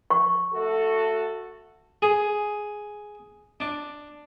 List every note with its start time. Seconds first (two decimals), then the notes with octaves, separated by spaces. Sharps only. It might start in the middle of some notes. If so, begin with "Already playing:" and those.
0.10 C#6
0.53 A3 F#4 A4
2.02 G#4
3.60 D4